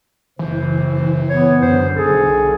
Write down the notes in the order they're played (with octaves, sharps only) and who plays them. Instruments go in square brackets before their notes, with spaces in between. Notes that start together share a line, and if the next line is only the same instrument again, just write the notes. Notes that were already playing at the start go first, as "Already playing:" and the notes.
[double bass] F#1 [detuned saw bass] E3 [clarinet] C5
[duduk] B3 [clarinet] C#5
[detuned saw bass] F#2 [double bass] D3 [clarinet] C5
[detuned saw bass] B1 [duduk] G#4 [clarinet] A4